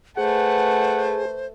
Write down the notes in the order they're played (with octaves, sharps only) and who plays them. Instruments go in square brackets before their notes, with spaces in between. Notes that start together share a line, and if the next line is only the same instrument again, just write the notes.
[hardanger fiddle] A3 B4 [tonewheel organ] G#4 [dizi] C5 [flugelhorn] F#5